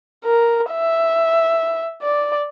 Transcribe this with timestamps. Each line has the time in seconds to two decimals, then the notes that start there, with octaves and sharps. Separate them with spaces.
0.25 A#4
0.72 E5
2.02 D5